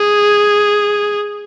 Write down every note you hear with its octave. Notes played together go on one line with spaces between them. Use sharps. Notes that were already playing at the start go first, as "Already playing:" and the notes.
Already playing: G#4